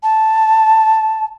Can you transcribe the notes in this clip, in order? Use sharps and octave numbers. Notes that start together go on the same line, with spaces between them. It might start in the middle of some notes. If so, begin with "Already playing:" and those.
A5